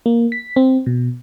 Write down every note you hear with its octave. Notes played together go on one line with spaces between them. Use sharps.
A#3
B6
C4
B2